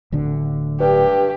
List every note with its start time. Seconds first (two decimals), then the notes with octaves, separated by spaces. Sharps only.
0.12 D1 D2 D3
0.80 G2 G4